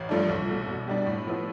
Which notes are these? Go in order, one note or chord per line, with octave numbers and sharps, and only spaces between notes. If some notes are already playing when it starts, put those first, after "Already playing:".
Already playing: A1
G2 F3 A3 D4
C2
B2 A3
B2
G3 D4 G4
A2
F3 B3 E4